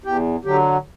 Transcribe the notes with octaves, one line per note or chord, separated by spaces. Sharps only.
E2 G4
D3 F#3 G4